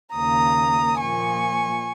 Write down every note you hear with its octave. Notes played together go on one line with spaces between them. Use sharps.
D#2 C#3 A#3 A#5 D#6
A#2 F3 A#3 G#5 C#6